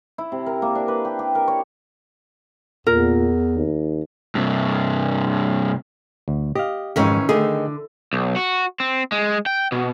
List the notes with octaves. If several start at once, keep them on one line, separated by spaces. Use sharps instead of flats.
E4
C3
A#4
A#3
D4
B4
G4
G4
A#4
C#5
E2 A#2 A#4
D#2
G2 C3
D2
G4 D#5 F5
F2 G#2 D#3 E3 C#4
D3 D#3 A3 G#4
B1
F#4
C4
G#3
G5
B2